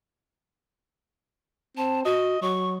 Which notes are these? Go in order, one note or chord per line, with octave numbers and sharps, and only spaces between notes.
C4 A5
F#4 D#5
F#3 C#6